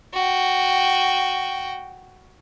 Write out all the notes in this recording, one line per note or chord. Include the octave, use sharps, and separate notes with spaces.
F#4 G5